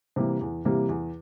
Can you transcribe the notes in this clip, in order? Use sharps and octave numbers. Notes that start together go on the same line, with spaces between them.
C3 E3 G3 A#3
E2
C3 E3 G3 A#3
E2